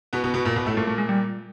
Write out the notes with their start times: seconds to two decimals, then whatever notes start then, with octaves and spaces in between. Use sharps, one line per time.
0.13 B2 B3
0.24 B2 B3
0.34 B2 B3
0.45 A#2 A#3
0.56 B2 B3
0.66 A2 A3
0.77 A#2 A3 A#3
0.87 A3
0.98 G#3
1.09 G3